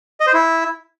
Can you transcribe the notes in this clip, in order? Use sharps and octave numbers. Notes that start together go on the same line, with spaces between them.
D#5
C5
E4